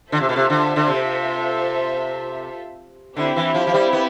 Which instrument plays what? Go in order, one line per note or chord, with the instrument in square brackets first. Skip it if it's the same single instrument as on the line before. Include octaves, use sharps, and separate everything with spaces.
[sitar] D3 [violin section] F4 A4 C5 E5
[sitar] C3
B2
C3
D3
D3
C3
[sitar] D3 [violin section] C4 E4 G4
[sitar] E3
F3
F3
G3
B3